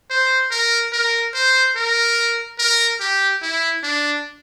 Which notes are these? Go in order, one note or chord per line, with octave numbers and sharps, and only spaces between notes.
C5
A#4
A#4
C5
A#4
A#4
G4
E4
D4